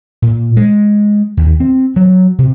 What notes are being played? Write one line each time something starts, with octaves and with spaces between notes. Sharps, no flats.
A#2
G#3
D#2
C4
F#3
C3